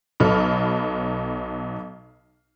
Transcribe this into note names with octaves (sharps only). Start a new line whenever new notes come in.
B1 F#3 A4 B5 F6